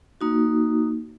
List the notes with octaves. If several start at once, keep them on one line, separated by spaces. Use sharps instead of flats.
A#3 D#4 F#4